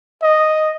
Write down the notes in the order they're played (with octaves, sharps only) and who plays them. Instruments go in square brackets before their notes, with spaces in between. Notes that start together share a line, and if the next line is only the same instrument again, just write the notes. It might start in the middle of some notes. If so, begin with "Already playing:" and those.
[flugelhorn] D#5